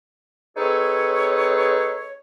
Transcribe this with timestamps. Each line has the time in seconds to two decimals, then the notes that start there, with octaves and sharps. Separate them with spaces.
0.56 C4 D#4 G#4 A4 B4 C#5